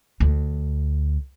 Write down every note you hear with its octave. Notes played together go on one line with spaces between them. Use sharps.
D2